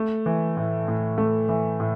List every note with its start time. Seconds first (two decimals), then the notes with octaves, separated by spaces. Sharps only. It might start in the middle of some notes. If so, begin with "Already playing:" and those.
Already playing: A3
0.26 E3
0.57 A2
0.88 A2
1.18 A3
1.49 E3
1.80 A2